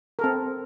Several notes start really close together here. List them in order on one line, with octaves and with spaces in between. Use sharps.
A#4 A4 C4